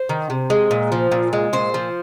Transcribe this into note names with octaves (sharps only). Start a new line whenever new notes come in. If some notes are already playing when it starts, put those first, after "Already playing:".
Already playing: C5
D#3
C3
G#3
A#2
F3
A#2
G#3
A#2 C5
F3